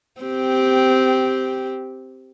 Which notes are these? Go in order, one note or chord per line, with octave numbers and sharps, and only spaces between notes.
C4 G4